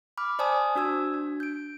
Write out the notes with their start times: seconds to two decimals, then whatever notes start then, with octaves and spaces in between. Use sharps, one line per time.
0.17 B5 D6 F6
0.39 C5 D5 G#5 A5 D#6 F6
0.75 D4 F#4 E6 G#6
1.14 D4
1.40 G6 D7